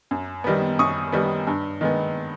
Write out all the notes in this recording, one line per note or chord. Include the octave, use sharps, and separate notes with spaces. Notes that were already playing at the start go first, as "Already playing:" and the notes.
F#2
D#3 G3 B3
F#2 C#6 D#6
D#3 G3 B3
G2
D#3 G#3 B3